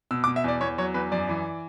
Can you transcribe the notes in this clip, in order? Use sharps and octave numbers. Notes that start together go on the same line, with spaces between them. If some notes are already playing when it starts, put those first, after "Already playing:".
B2 E6
D6
B2
E5
E2 D5
E2 C#5
F#3 C#5
E2 B4
F#2 D5
E3